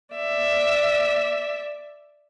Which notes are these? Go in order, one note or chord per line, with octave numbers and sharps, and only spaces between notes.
D5 E5